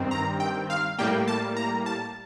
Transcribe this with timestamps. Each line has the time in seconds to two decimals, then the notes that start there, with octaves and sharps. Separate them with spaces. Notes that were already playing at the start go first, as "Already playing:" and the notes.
Already playing: G2 D#3 G3 C4
0.11 A#5
0.40 G5
0.70 F5
0.99 A2 G3 A#3 G5
1.28 A5
1.57 A#5
1.86 A5